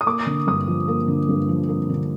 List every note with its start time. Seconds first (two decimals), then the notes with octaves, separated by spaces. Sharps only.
0.01 D#6
0.06 A#3 D6
0.26 D3
0.47 G2 D#6
0.68 F3
0.88 A#3
1.08 D3
1.29 G2
1.49 F3
1.69 A#3
1.89 D3